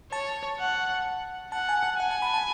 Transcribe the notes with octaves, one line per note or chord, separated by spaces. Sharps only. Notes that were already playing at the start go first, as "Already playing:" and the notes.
C#5 A5
F#5
F#5 A5
G#5
G#5
F#5 G#5
A5
B5
A5